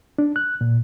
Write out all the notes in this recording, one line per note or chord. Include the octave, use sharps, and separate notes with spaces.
D4
F#6
A#2